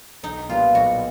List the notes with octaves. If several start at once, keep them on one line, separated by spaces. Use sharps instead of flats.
B1 D#4
A#2 G3 B3 F4
B1 F#4